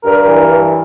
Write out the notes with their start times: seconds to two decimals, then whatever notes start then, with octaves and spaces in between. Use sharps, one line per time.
0.03 G2 A#4
0.26 E3
0.49 G2